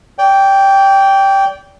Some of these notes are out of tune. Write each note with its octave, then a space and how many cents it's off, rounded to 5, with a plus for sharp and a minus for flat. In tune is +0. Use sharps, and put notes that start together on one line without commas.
D5 -35 G5 +0